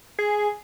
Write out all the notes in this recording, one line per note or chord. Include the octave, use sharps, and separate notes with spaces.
G#4